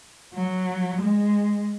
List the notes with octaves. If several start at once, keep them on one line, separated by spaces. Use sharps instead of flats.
F#3
G#3